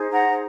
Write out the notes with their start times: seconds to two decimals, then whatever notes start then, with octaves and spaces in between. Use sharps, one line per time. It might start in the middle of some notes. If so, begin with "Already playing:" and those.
Already playing: D#4 G#4 C5
0.12 F#5 A#5